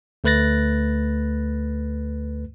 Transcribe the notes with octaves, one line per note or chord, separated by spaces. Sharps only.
D2 A3 B4 F#6 A6 A#6